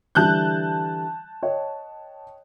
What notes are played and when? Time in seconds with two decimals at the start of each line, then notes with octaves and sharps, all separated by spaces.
0.15 D3 E3 G3 A5 F#6 G6
1.43 C#5 D#5 G5